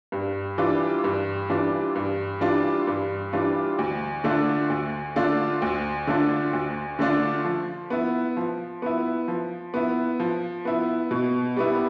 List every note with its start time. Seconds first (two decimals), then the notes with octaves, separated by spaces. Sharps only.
0.12 G2
0.58 E3 G3 D4 F4
1.04 G2
1.50 E3 G3 D4 F4
1.95 G2
2.41 E3 G3 D4 F4
2.87 G2
3.33 E3 G3 D4 F4
3.79 D2
4.24 D3 A3 D4 F4
4.70 D2
5.16 D3 A3 D4 F4
5.62 D2
6.07 D3 A3 D4 F4
6.53 D2
6.99 D3 A3 D4 F4
7.44 F3
7.90 B3 E4
8.37 F3
8.82 B3 E4
9.28 F3
9.74 B3 E4
10.20 F3
10.65 B3 E4
11.11 B2
11.57 G3 B3 E4